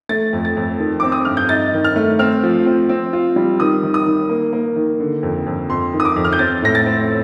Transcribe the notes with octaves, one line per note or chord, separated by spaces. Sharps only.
A3 A6
F2
A6
F2
D#3
C4 D6
D#6
G2 F6
G6
D#4 A6
D#3
F6
A3
C4 F6
F3
C4
C4
F4
G3
D#3 D#6
D#3
D#6
D#3
A#3
A#3
D#3
D3
F2
F2
F2 C6
D#3
D#6
D6
F2
F6
G6
C4 A6
A2 A#6
A6
C4